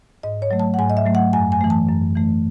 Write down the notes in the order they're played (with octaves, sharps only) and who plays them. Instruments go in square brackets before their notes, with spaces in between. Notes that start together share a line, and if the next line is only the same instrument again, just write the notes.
[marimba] G#2 D#5
C#5
F#3 A3
A5
F#5
G#2 G#5
D#5
E5
F#3 A3
F#5
F#2 G#5
G#5
E3 A3
A5
F#2
E3 A3